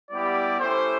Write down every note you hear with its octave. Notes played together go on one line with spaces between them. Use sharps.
G3 B3 E4 G4 D5
A3 C#4 E4 G4 C5